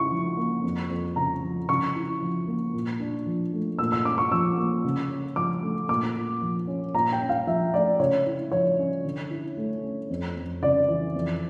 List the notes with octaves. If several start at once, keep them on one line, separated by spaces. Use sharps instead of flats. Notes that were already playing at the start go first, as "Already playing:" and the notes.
Already playing: C#3 E4 C#6
F3
A#3
F2
F2
C#3 A#5
F3
C#3 C#6
E4
F3
A#3
A#2
D4
F3
A3
A#2 E6
E6
C#4 D6
C#6
F3 E6
A#3
C#3
C#4
F3 D6
A3
A#2 D6
A#2
F3
C#4
A#2 A#5
G5
C#4
F5
F3 E5
A3 D5
C#3 C#5
E4
F3 C#5
C#4
D3
E4
A3
C#4
F2
F2
C#3 D5
E3
F2